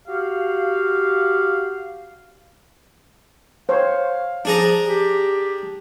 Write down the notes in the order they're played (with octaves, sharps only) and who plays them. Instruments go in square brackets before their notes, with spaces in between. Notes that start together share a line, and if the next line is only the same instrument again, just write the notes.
[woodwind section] F#4 G4 F5
[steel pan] C5 C#5 [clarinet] F5
[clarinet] F3 [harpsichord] D4 G#4 A#5
[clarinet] G4